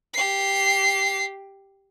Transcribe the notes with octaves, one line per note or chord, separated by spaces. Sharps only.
G4 C7